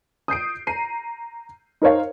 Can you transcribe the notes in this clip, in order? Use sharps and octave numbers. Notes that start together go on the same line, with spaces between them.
D#6 G6 C7 D7
A#5 C7 D#7
D#4 A#4 C5 C#5 F5